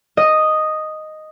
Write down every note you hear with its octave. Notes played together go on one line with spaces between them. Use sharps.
D#5